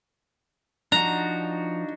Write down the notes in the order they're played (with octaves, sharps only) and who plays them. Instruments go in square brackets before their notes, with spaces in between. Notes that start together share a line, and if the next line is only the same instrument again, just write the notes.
[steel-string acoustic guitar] F3 [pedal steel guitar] D4 D#4 F#4 [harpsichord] A#5